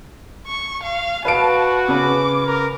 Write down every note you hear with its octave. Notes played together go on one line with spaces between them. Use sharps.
C#6
F5
F#4 B4 F5 A5 D7
C#3 B4 D6
A#4